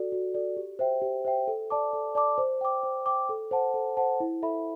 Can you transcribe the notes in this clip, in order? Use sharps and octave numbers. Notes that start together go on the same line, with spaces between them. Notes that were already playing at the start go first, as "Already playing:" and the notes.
Already playing: F#4 A4 D5
F#4
A4 D5
G4
C5 E5 G5
G4
C5 E5 G5
A4
D5 A5 D6
A4
D5 A5 D6
C5
G5 D6
C5
G5 D6
A4
C5 F#5 A5
A4
C5 F#5 A5
E4
A4 E5 B5